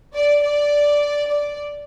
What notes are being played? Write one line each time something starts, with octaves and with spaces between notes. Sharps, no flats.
D5
D5
D5